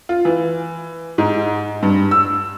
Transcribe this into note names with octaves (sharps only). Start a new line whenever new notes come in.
F4
E3
G#2
G2
E6